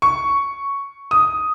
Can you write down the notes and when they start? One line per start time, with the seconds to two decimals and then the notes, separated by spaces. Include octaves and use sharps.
0.02 C#6
1.11 D#6